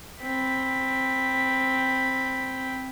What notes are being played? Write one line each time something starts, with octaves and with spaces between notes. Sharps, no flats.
C4 B5